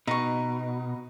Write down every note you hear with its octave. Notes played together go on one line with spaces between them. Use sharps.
B2 D#4 C#6